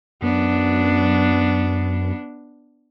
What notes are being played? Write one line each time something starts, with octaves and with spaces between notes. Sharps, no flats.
F#2 B3 D4